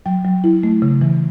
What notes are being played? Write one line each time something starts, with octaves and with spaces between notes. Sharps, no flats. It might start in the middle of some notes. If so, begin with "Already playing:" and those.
F#3 G5
F#3
E4
A3
C#3
E3